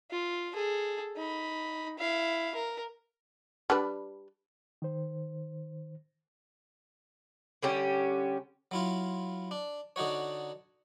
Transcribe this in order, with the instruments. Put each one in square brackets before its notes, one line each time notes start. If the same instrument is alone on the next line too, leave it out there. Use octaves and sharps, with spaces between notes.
[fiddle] F4
G#4 A4
D#4 B5
E4 F5
A#4
[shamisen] G3 D4 B4
[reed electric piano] D#3 C5
[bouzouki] D3 G3 C#4 G4
[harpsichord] F#3 E4 F4
D4
D3 D4 D#4 F#4 C#5